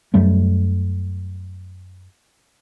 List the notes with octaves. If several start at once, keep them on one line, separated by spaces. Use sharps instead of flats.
F#2 F#3 G3 A3